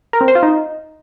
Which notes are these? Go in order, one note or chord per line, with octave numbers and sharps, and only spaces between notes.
A#4
C4
C5
F4
D#4